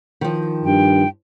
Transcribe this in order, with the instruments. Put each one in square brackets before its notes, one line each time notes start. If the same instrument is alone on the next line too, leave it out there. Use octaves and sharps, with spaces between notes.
[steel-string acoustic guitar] D#3 F3
[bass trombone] G2 [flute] G5